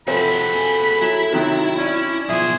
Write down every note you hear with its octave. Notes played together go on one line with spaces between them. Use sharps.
C3 F3 C4 F#4 G#4 A4 B5
F#3 E4
C3 D#3 F#3 D#4
C#4 D5
B1 F3 G#4 C5 E5